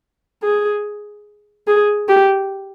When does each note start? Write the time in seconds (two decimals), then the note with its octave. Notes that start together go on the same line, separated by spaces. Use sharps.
0.43 G#4
1.67 G#4
2.09 G4